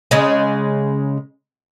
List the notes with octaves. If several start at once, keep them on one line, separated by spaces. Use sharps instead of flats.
C#3 G#3